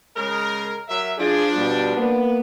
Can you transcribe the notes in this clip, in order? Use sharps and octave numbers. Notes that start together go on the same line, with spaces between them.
C#3 G#3 A#4
F#3 A#4 E5
F3 D4 F4 G#4
B2 G3
A#3 B3